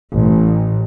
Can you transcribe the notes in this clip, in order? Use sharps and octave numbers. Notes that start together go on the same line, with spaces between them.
A1